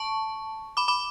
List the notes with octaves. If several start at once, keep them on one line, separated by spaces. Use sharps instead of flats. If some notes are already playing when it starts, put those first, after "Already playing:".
Already playing: A5 C#6
B5 D6
B5 D6